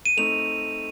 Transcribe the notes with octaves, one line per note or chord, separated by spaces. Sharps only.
D#7
A3 C4 D#4 F7